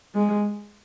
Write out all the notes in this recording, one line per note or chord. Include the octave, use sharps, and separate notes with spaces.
G#3